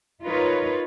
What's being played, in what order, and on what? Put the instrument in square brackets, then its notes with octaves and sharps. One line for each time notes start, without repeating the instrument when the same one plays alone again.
[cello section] D#4 F4 A#4 B4 C#5